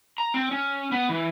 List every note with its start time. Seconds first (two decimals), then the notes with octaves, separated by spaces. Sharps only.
0.18 A#5
0.34 C4
0.51 C#4
0.92 B3
1.09 E3